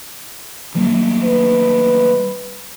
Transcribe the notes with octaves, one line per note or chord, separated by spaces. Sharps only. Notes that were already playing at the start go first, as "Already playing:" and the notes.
F#3 G3 A#3
B4